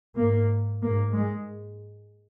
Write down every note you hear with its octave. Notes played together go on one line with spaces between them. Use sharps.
G#2 A#3
G#2 A#3
G#3